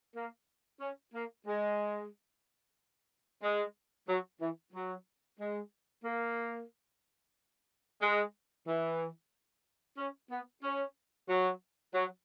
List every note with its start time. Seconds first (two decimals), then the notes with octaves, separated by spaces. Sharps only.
0.16 A#3
0.81 C#4
1.14 A#3
1.47 G#3
3.43 G#3
4.08 F#3
4.41 E3
4.73 F#3
5.39 G#3
6.04 A#3
8.01 G#3
8.67 E3
9.98 C#4
10.31 B3
10.64 C#4
11.29 F#3
11.94 F#3